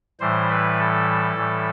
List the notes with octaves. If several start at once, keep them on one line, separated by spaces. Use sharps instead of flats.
A2 E3 G3 C5
B4
A4
A2 E3 G3